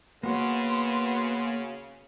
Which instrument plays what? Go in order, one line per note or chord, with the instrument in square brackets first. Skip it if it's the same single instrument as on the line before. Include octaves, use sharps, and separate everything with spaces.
[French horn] C#3 [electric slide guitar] A#3 F#4 [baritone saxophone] B3 [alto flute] C6